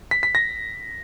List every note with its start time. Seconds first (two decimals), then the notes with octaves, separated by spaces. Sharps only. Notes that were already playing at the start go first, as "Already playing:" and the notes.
0.11 B6
0.23 B6
0.35 A#6